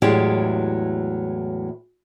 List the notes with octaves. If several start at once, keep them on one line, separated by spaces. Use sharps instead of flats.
E2 A2 F#3 G#3 E4 G4